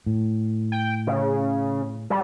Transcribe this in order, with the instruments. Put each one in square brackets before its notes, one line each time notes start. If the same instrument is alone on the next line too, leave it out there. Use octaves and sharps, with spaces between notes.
[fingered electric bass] A2
[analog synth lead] G5
C#3
G3